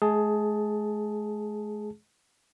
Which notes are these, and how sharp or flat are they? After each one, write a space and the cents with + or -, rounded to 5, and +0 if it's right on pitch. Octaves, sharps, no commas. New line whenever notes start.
G#3 +40 G#4 +10 A5 +0